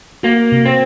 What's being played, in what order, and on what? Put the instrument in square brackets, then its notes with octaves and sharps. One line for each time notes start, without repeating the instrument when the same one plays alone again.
[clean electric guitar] A#3 [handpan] F#4
[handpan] C3
[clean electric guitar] C4